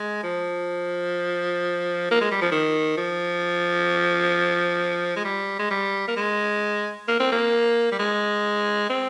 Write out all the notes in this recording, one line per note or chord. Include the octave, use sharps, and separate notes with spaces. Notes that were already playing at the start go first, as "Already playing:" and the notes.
Already playing: G#3
F3
A#3
G#3
G3
F3
D#3
F3
G#3
G3
G#3
G3
A#3
G#3
A#3
C4
A#3
G3
G#3
C4